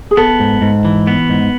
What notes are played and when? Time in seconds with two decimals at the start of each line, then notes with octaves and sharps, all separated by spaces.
0.11 G#4
0.17 B3 A4
0.40 G#2
0.62 G#2
0.85 E3
1.07 B3
1.30 G#2